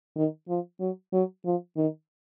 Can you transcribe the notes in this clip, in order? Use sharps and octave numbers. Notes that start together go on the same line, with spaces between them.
D#3
F3
F#3
F#3
F3
D#3